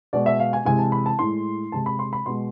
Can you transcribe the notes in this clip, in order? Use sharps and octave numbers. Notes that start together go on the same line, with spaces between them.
B2 G#3 D5
E5
F5
G#5
C3 E3 G#3 G#5
A5
B5
A5
A2 G#3 C6
C3 G#3 A5
B5
C6
B5
B2 G#3 C6